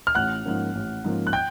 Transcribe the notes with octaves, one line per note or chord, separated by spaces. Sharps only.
F6
A1 F#5 F#6
G#2 F3 A#3 C#4
A1
G#2 F3 A#3 C#4
F#6
G5 G6